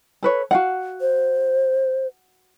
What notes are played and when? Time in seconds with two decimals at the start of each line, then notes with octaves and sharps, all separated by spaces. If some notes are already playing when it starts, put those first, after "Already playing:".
0.23 A4 B4 C#5
0.51 F#4 F5 F#5
1.01 C5